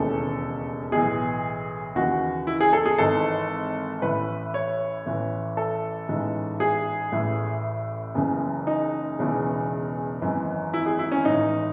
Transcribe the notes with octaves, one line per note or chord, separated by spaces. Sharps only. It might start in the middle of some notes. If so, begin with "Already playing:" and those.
Already playing: E1 D#2 C#3 E3 A4
B1 A2 E3 G#4
D#2 C#3 E3 F#4
E4
G#4
A4
G#4
G#1 G#2 E3 A4
A1 A2 E3 B4
C#5
A1 A2 E3
A4
A1 G#2 E3
G#4
A1 A2 E3
F#1 F#2 C#3 E3
D#4
E1 E2 C#3 E3
G#1 F#2 E3
E4
G#4
E4
C#4
A1 G#2 E3 D#4